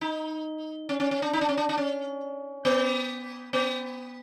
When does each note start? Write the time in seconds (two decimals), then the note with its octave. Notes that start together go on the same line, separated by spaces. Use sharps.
0.01 D#4
0.89 C#4
1.00 C#4
1.11 C#4
1.22 D4
1.33 D#4
1.41 D4
1.49 C#4
1.57 D4
1.69 D4
1.78 C#4
2.65 B3
3.53 B3